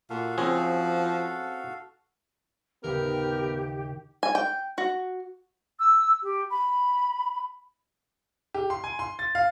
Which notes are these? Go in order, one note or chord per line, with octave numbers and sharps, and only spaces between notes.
A#2 F#4 A4 F5
F3 C4 C#4 G#4
D#2 A2 C#3 B3 G4 A#4
G#5
G5
F#4
E6
G4
B5
G4
C6
G#5
C6
A6
F5